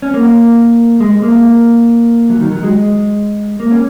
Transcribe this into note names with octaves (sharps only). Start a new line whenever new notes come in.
C#4
A#3
G#3
A#3
F#3
D#3
F#3
G#3
A#3
C#4